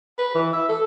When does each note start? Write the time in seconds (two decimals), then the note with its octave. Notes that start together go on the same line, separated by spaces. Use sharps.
0.18 B4
0.35 E3
0.53 E5
0.69 A4